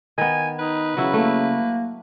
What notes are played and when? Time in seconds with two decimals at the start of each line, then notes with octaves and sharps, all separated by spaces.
0.18 D#3 B3 G#5
0.59 D#4 B4
0.97 C#3 F#3 E4 F#4
1.14 A3 A#3